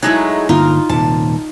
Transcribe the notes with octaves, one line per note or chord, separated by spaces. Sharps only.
F#3 G#3 A3 D#4 E4
G1 D3 A#3 D#4 F4 A#4
D#1 C3 A5